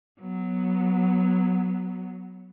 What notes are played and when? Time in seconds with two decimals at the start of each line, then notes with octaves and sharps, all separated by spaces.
0.21 F#3 B3